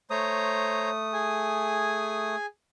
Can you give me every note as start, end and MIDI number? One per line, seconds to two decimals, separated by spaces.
0.10 2.36 57
0.10 0.90 72
0.10 0.90 73
0.10 0.90 82
0.10 2.36 87
1.13 2.46 68
1.13 2.46 80